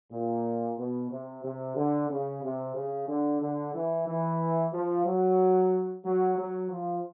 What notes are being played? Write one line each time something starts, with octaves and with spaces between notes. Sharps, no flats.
A#2
B2
C3
C3
D3
C#3
C3
C#3
D3
D3
E3
E3
F3
F#3
F#3
F#3
F3